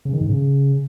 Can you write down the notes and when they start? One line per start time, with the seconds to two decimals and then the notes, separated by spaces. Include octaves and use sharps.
0.05 C#3
0.13 D#3
0.21 G#2
0.29 C#3